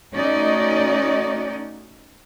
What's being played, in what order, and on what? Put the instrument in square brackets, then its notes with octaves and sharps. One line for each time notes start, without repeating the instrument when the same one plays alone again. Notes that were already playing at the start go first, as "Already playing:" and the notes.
[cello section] A3 C#4 D#4 F#4 D5 D#5